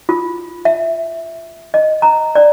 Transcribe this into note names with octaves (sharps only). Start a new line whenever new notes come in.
F4
E5
D#5
A#5
D5